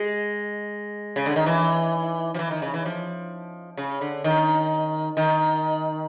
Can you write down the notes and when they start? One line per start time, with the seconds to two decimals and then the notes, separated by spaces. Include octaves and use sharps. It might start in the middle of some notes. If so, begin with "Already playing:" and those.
Already playing: G#3
1.16 C#3
1.26 D3
1.36 D#3
1.46 E3
2.34 F3
2.39 E3
2.51 D#3
2.62 C#3
2.74 E3
2.86 F3
3.77 C#3
4.01 D3
4.24 D#3
5.17 D#3